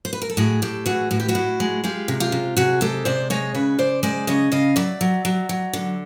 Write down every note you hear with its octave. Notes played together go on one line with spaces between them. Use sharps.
C5
B4
A#4
A4
A2 F#4 G#4
A2 G4 A4
E3 F#4 G#4
A2 F#4
G4
E4 F#4
A2
G#3
G#3 F4 G4
C3
F4 G4
C3
C3 F#4 G#4
G#3 G4 A4
C3 C5 D5
G#3 C#5 D#5
C#3 B4 C#5
C#3 C5 D5
G#3 C5 D5
C#3 C#5 D#5
C#3 D#5 F5
F#3 D5 E5
F#3
F#3
F#3
D3